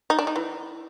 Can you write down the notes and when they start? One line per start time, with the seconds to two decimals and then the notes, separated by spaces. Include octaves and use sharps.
0.10 D#4
0.19 D4
0.27 D#4
0.36 E3